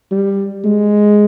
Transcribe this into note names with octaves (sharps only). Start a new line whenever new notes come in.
G3
G#3